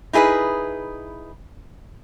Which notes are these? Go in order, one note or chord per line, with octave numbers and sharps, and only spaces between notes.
D#4 E4 G#4 A4 B4